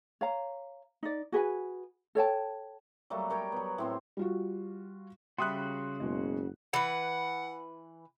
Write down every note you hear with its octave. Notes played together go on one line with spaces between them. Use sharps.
C#5 F5 A#5
D#4 D5
F#4 G#4 B4 G#5
A4 C#5 G5 A5
F#3 G3 A3 A#3
A#4 C#5 G5 A5
F#3 B3
A2 C4 C6
G3 F4 F#4
C#3 G3 F#4 E5 B5 C6 D#6 F#6
F#1 B2 G#3
E3 B4 F#5